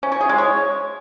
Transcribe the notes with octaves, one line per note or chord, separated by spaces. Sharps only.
C#4
C#5
G#4
G#3
C#5